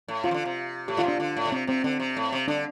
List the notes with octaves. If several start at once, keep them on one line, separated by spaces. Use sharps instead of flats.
A2
C3 F4
F3
D3
C3
A2 G4
D3 F4
C3 D4
D3 F4
A2
D3
C3 C4
C3 C4
D3 C4
C3
A2
C3
D3 D4